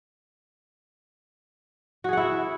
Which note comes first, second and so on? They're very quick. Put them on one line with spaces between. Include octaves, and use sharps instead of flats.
F#4 G#4 F#5 E4